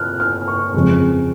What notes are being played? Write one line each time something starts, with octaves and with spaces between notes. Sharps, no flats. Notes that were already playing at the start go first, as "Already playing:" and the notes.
Already playing: A#2 F6 F#6
F6
C#6
F2 C#3 G#3